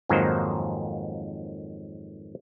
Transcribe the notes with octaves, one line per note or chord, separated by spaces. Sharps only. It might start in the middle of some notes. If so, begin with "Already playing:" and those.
F2 G#2 D#3 F#3 A#3 C5